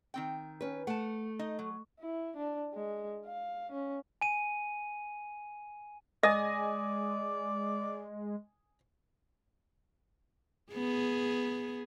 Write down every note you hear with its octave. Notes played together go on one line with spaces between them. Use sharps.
D#3 C4 G5
C#4 B4
A3 F#5 A5
D#4 D#5
F#3
E4
D4
G#3
F5
C#4
G#5 D#7
G#3 D5 D#5 G#5 D#6 A#6
B3 G#4